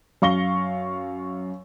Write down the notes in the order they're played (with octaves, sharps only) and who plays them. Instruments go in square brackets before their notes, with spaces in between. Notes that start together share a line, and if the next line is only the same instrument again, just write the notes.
[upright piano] F#2 F5 C#6 A#6 G7